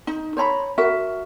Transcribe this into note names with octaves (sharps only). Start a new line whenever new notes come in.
D#4
C5 C#5 A#5 B5
F#4 A#4 E5